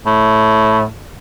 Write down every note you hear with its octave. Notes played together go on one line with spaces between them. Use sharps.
A2